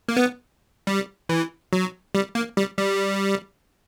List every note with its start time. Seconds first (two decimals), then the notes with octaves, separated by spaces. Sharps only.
0.08 A#3
0.17 B3
0.87 G3
1.29 E3
1.73 F#3
2.15 G3
2.35 A#3
2.57 G3
2.77 G3